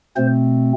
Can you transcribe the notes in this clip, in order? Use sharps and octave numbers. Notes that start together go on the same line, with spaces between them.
B2 A3 C4 C5